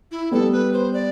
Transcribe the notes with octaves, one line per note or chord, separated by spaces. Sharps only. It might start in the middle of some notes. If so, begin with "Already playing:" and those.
E4
G3 B3 A4
B4
C5
D5